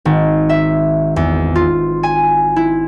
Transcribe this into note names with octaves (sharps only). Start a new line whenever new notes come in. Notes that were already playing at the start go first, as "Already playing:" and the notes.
G#1
E5
E2
F4
G#5
E4